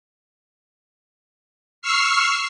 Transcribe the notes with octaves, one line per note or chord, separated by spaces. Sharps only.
C#6 E6 F6 C7